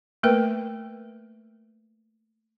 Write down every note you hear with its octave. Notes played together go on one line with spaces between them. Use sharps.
A3 A#3 A#4 B4 G5